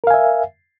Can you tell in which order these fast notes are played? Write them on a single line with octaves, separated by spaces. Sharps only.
A#4 F5 G#5 E5